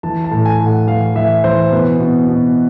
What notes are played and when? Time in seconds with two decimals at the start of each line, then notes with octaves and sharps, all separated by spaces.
0.03 E3 A5
0.24 A5
0.31 A2
0.46 G#5
0.59 A2
0.66 F#5
0.87 E3 F5
1.15 E3 E5
1.44 E3 C5
1.72 B2 B4
2.00 B2
2.28 B2